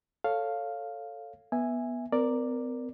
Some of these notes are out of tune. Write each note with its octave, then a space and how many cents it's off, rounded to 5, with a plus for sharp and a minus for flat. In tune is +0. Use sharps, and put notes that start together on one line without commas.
A4 +5 C#5 +0 F5 +0
B3 -15 E5 +0 G#5 -10
C4 -45 A#4 +0 D5 +0